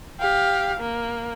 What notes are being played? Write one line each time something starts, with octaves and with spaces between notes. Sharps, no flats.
G4 F5
A#3